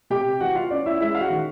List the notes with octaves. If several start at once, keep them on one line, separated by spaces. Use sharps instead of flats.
C3 G4 G5
E3 F#4 F#5
F4 F5
C#4 D5
E4 E5
G#3 E4 E5
F5
F#4 F#5
D#3